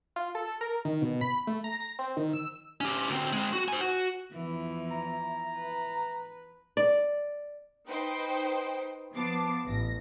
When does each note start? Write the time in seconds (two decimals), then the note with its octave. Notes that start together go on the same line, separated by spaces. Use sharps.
0.16 F4
0.35 A4
0.61 A#4
0.85 D#3
1.02 B2
1.21 B5
1.47 A3
1.64 A#5
1.80 A#6
1.99 C4
2.17 D#3
2.33 E6
2.81 C#4 G4
3.09 D2 C4
3.33 G#3 C4
3.53 F#4
3.68 C5 G#5
3.80 F#4
4.33 E2 E3 F3 E4
4.91 A#5
5.56 B4
6.77 D5
7.88 D#4 B4 C5 G5
9.15 F3 B3 A5 D6 C7
9.65 A1 A#6